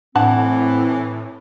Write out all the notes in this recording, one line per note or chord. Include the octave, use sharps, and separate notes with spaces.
A2 E3 C4 D4 F#5 A5